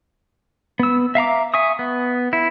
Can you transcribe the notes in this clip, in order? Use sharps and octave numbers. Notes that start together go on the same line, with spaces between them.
B3 E6
E5 F5 A#5 D6
E5 G#5 C#6 D#6
B3
E4